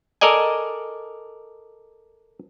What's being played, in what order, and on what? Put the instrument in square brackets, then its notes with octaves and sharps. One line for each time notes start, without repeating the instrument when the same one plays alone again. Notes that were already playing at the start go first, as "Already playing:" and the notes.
[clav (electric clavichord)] A4 A#4 D5 D#5 G#5